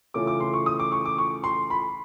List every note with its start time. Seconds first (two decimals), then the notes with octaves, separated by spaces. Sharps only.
0.14 C#3 E3 A3 C#4 F4 D6
0.27 D6
0.40 C6
0.54 C#6
0.66 D#6
0.79 D6
0.92 C#6
1.05 D6
1.18 C#6
1.44 C6
1.70 B5